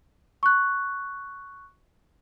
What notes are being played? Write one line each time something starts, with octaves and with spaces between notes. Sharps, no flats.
C#6 F#6